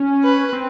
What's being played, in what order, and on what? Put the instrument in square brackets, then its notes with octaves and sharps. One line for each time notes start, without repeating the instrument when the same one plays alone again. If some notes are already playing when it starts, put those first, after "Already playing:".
Already playing: [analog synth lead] C#4
[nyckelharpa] B4
[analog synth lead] C4